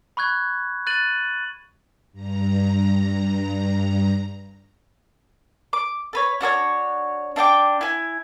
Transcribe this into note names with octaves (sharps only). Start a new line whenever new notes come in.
B5 C#6 F#6 G#6
F#6 A6 D#7 F#7
G2 A#5
D6
A4 B4 C#5
D4 F#4 A4 C#5
D4 E5 G5 D6
E4 G#5